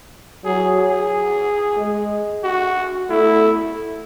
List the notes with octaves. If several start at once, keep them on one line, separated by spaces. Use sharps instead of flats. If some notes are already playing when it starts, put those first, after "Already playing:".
F#3 G#4
G#4
G#3
F#4
A3 E4